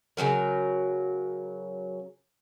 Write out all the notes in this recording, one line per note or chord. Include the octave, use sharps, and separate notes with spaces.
C#3 F3 F#3 A#4